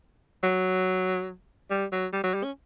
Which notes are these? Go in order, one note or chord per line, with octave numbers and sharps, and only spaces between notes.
F#3
G3
F#3
G3
F#3
G3
C#4